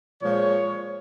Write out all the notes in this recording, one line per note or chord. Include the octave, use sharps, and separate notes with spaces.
A#2 F3 G#3 C#5